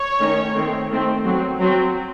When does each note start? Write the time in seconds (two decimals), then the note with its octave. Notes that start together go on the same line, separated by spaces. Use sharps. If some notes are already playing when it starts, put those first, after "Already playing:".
Already playing: C#5
0.20 D#3 A3 C#4
0.54 D#3 A3 C4
0.90 D#3 A3 C4
1.24 F#3 C4
1.59 F#3 C4